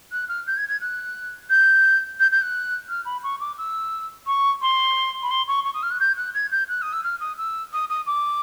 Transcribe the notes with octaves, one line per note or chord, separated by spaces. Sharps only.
F#6
F6
G6
G#6
G#6
F#6
G6
G6
G6
F#6
F6
B5
C#6
D6
E6
C#6
C6
B5
C6
C#6
C#6
D#6
F6
F#6
G6
F#6
G#6
G6
F#6
D#6
E6
F6
D#6
E6
D#6
D#6
D6